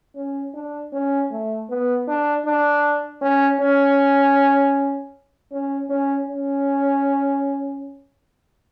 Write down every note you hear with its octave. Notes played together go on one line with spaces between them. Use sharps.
C#4
D4
C#4
A3
B3
D4
D4
C#4
C#4
C#4
C#4
C#4